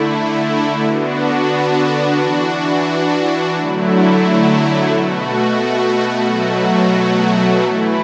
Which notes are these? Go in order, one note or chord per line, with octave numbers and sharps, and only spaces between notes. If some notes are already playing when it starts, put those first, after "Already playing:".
Already playing: D3 A3 E4
D3 B3 D4 F#4
E3 D4 F#4
D3 F#3 A3 E4
B2 A3 F#4
B2 F#3 A3 F#4
E3 A3 E4